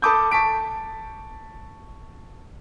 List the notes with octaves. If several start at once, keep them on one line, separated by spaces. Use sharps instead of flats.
A4 A5 B5 D6 D#6 G6
A5 C#6 B6 D7